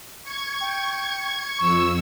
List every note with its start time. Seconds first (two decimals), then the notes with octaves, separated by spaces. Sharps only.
0.23 C#6 G#6
0.61 G5
1.58 F2 C#6 E6